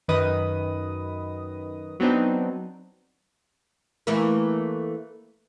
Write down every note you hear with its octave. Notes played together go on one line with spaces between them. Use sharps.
F#2 D#3 B4 D#5 D#6
F#3 B3 C4 D4 D#4
E3 A3 A#3